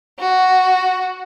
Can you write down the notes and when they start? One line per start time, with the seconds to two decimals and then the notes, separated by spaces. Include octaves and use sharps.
0.19 F#4